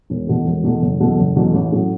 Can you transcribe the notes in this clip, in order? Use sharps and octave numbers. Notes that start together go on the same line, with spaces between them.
E1
E2 B2 A3
E1
E2 B2 A3
F#1
E2 B2 F#3 A3
F#1
E2 B2 F#3 A3
A1
A2 F#3 C#4